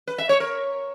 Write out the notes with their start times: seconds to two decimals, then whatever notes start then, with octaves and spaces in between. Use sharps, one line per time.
0.07 B4
0.18 E5
0.29 C#5
0.40 A#4